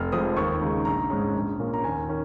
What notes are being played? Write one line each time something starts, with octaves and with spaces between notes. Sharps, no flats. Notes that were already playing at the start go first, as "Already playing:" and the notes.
Already playing: F1 F6
F2 F3 G#3 D#6
D#2 C#6
C#3 G#3 D#4
A#1 A#5
G#2 G#3 C#4
A#1
A#2 A#3 C#4
A#5
D#2 G#5
D#3 C#4